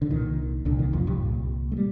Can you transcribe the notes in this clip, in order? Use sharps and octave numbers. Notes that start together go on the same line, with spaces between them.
D3
C2 A#2 D#3
C2 A#2 D3
D#3
F2 F3
G2 G3
C2 A#2
A3
G3